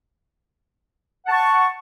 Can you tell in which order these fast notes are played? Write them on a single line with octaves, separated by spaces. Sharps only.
F#5 A5 C#6